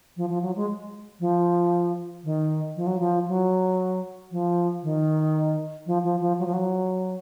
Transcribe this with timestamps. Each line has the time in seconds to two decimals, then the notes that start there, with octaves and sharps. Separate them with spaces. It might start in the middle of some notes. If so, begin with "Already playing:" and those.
0.17 F3
0.30 F3
0.42 F#3
0.56 G#3
1.20 F3
2.24 D#3
2.76 F3
2.87 F#3
2.99 F3
3.28 F#3
4.31 F3
4.83 D#3
5.86 F3
6.04 F3
6.21 F3
6.39 F#3
6.46 F3
6.53 F#3